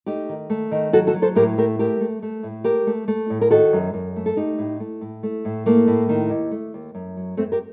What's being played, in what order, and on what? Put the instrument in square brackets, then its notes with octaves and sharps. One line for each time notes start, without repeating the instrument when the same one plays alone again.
[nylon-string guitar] A3 D#4 G4
D#3
A3
D#3
F#3 F#4 A4
F#4 A4
F#3
A4 C5
A2 G4 A#4
A3 G4 A#4
A3 G4 A#4
A3
A3
A2
A3 G4 A#4
A3
A3
A2
A#4
D#3 F#4 A4
F#2
F#2
A3
A4
A3 D#4 G4
A2
A3
A2
A3
A2
A3 A#3
A2
D#3
D#2
A3
D#2
F#2
F#3
F#2 A3 C4
G4 A#4